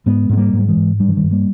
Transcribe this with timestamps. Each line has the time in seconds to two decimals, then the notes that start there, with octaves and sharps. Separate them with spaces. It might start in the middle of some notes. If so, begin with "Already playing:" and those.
0.06 G#2 G#3 B3
0.29 G#2 B3
0.37 G3 A#3
0.53 G#2
0.59 G3
0.68 E3 G#3
0.76 G#2
1.00 G2 G3
1.08 E3
1.17 D#3 G3
1.23 G2
1.31 G3 A#3